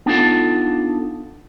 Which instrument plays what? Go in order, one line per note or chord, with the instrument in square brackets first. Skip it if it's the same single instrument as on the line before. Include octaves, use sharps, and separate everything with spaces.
[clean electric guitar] B3 D4 D#4 F4 A4